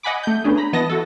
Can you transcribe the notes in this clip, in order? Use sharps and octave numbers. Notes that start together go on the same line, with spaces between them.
D#5 F#5 G#5 B5 D6
A3 G6
A3 B3 C#4 D4 G#4
A#5 B5
E3 B3 D#5 A5 A#6
E4 F#4 A4